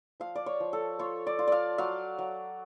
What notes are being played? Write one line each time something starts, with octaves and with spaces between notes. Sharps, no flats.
F3 F5
D5
C#5
F3
A4
F4 C#5
D5
F4
D5 F5
F#3 F5
F#3